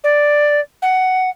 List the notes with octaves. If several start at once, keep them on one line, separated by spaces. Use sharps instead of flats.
D5
F#5